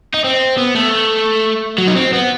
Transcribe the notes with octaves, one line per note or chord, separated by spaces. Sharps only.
D#4
C4
B3
A3
F#3
D#4
C4
B3